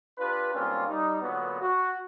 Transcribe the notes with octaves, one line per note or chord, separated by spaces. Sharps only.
D4 F4 G4 B4
B1 G3 A#3 C4 C#4 F4
G3 D#4
A#2 D3 F#3 B3
F#4